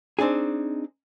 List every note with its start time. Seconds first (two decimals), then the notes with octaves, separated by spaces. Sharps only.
0.19 C4 D4 D#4 G#4